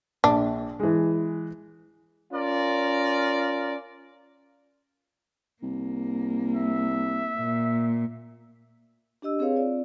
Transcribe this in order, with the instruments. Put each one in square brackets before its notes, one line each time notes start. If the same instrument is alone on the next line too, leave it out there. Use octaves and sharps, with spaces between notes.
[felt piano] A#1 [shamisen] D4
[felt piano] E3 G#3
[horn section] C#4 F4 A#4 D5
[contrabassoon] C2 [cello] A#3
[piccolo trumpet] E5
[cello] A#2
[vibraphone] D4 G4 D#5 E6
C4 G#4 B4 C#5 F5
C4 F4 D5